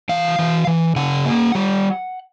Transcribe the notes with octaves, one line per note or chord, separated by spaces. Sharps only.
E3 F5
E3
E3
C#3 F#5
A#3
G3